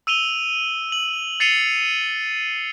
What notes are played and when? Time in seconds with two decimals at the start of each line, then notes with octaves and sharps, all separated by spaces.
0.07 E6 D#7 F7 G7
0.92 F#7
1.40 A6 C7 C#7 D#7 F7 G7